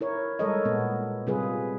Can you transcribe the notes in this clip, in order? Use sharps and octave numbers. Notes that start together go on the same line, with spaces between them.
E4 A#4 C#5
G3 G#3 A4 A#4 C#5 D#5
A#2 B3
C3 G3 F4 G#4 B4